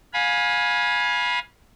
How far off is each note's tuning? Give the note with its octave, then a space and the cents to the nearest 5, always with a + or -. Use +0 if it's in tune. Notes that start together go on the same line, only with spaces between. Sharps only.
F5 +25 G#5 +0 B5 -20